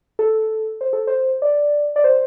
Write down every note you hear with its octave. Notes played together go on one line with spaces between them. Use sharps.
A4
C5
A4
C5
D5
D5
C5